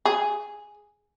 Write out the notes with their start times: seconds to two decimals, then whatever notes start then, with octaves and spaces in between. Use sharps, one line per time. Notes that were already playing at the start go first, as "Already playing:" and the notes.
0.05 G#4